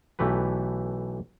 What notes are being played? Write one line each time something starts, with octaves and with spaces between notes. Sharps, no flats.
B1 E3 A3 G4 B4